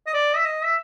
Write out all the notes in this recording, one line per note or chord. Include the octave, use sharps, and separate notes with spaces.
D#5
D5
E5
D#5
E5